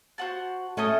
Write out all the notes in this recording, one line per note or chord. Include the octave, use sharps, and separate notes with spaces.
F#4 C5 F#5 A5
A3 C#4 A4 D#5